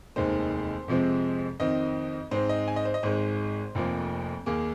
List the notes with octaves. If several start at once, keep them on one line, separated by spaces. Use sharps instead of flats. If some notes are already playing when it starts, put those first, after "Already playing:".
F1 D#2 D#3 G#3 C5
F2 C3 F3 G#3 C4
F2 D#3 C4 D#5
G#2 G#3 C4 C5
D#5
G#5
D#5
C5
D#5
G#1 G#2 G#3 C5
F1 F2 F3 A#3
D#2 D#3 A#3 G#4